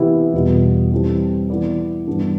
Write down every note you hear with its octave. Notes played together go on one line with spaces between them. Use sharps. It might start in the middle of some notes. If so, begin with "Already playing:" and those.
Already playing: C3 E3 B3 E4 B4
E2 B2 G3 B3 F4
E3 G3 C4 E4 A4
E3 B3 E4 B4 D5
G2 E3 B3 D4